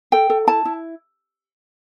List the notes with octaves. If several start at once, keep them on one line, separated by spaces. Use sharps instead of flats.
A4 G5
A4
E4 A5
E4